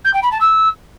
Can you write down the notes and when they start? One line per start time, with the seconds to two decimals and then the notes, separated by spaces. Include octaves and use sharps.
0.04 G6
0.13 G5
0.22 B5
0.31 A5
0.40 E6